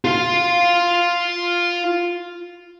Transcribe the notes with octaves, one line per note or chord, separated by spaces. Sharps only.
F4 F5